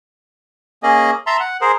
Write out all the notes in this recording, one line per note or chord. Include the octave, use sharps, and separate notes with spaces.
A#3 C#4 G#4 D#5
E5 A5 A#5 C6
F#5
G#4 A#4 C5